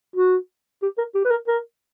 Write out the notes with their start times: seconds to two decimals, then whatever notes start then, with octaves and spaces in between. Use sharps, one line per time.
0.16 F#4
0.82 G4
0.98 A#4
1.15 G4
1.25 B4
1.31 A#4
1.48 A#4